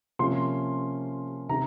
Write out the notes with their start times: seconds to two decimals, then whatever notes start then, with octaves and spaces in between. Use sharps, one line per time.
0.19 C3 F3 A#3 C#4 C6
1.49 C3 D#3 A#5